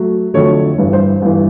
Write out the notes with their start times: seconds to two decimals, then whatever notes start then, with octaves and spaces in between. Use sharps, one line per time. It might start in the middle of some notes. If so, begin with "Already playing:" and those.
Already playing: F#3 A3
0.34 F2 D3 F#3 A3 C#5
0.78 G1 G2 E3
0.93 C5
1.22 G1 G2 E3